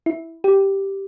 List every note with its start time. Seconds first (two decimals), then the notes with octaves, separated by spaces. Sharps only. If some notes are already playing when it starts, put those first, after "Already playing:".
0.06 E4
0.44 G4